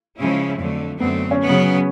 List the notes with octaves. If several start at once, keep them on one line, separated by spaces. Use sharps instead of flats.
C#3 F3 G#3 C#4 E4
F2 D3 F#3 A3
F#2 D3 F#3 A3 B3 C4
C#4
C#3 F#3 B3